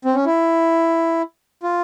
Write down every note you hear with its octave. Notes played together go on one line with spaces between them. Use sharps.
C4
C#4
E4
F4